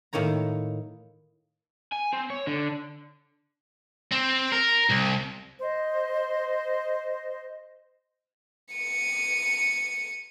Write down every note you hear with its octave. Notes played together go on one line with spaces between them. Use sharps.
A2 D#3 A#3 C#5 A#5
G#5
C4
C#5
D3
C4
A#4
C2
C5 D#5
C#7 D#7